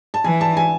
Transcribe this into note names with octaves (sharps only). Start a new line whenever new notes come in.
A5
E3 G#5
A5
G#5